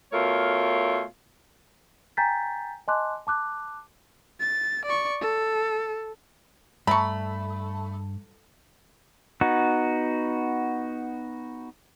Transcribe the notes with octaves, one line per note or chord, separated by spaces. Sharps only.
B2 A3 F4 A#4 C#5
G5 G#5 A#5 G6 A6 B6
D#5 G#5 A5 C6 D6 F#6
A5 D6 F#6
A6
D5 C#6
A4
G2 A3 A#5 B5 C#6
B3 D#4 F#4